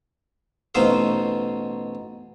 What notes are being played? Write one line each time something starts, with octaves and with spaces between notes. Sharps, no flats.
A1 B2 D#4 C5 E5 F5